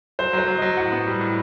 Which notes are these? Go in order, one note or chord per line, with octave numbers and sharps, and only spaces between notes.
F#3 C5
F#3
C5
F#3
F#3 D#5
A2 F#5
B3
G3
A2